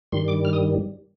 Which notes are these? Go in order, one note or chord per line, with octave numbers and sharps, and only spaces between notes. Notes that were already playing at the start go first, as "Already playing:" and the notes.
G2 D#3 G3 C6
D6
F6
D#6